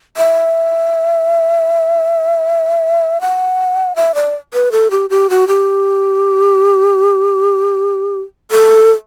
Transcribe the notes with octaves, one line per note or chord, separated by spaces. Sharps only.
E5
F#5
E5
D5
B4
A4
G4
G4
F#4
G4
A4